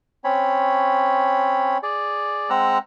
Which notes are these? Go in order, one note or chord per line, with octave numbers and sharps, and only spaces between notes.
C4 C#4 C#5 B5
G#4 D5
G#3 C4 F#5 A#5 E6 F#6